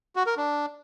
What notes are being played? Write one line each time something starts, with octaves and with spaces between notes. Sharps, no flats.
F#4
A#4
D4